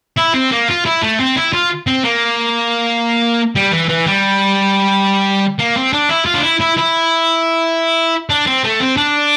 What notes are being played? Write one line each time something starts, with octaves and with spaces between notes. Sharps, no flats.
E4
C4
A#3
F4
E4
A3
C4
E4
F4
C4
A#3
G3
E3
E3
G3
A#3
C4
D4
E4
F4
D4
E4
E4
E4
D4
C4
A3
C4
D4